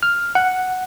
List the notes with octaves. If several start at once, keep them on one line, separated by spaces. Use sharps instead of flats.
F6
F#5